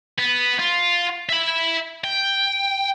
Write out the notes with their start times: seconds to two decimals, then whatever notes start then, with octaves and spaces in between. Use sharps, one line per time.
0.19 B3
0.59 F4
1.29 E5 B5
2.04 G5